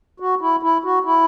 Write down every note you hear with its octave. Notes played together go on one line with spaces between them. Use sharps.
F#4
E4
E4
F#4
E4